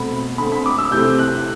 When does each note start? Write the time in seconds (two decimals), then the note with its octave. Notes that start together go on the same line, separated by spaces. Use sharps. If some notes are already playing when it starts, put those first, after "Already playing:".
Already playing: B2 A3 C4 B5
0.38 D3 A3 C4 B5
0.52 B5
0.66 D6
0.78 E6
0.91 C3 E3 A3 C4 G6
1.19 F#6